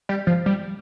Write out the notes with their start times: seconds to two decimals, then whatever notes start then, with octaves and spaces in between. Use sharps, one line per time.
0.09 G3
0.27 F3
0.46 G3